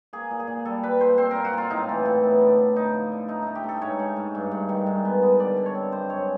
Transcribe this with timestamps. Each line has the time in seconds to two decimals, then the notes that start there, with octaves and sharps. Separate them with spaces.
0.13 A#3 G#4
0.31 A#2
0.39 G#4
0.48 A#2
0.65 G3 A4
0.83 G3 B4
1.01 A#2 C5
1.18 C4 C5
1.31 A#2 A#4
1.45 F#4
1.53 A#2 F4
1.70 A2 D#4
1.89 E3
2.05 A2
2.24 B3
2.41 D3
2.58 D3
2.76 D3 D#4
2.94 F3
3.12 D3
3.28 A3 D#4
3.42 A3 D#4
3.55 G4
3.64 A3 A4
3.81 G#2 C#5
3.99 A3
4.16 G#2
4.35 G2
4.52 G2
4.69 D#3
4.86 G#2
5.05 B3
5.22 B3
5.40 D3 D5
5.57 D3
5.66 C#5
5.75 C4
5.92 F#2 C5
6.09 G#3 C#5